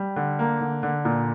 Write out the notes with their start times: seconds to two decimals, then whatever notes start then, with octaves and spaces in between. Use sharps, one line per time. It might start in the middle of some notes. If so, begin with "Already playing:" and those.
Already playing: G3
0.16 D3
0.39 A#3
0.61 D3
0.83 D3
1.05 A#2